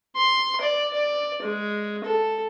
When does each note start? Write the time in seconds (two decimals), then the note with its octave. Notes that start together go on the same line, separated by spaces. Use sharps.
0.16 C6
0.61 D5
0.93 D5
1.42 G#3
2.04 A4